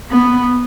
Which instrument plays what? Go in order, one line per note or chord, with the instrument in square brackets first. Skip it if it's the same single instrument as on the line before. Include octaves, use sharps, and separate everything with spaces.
[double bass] B3